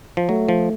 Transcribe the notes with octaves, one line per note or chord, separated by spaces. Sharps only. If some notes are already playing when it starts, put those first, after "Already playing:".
F3
F#3 A3
F3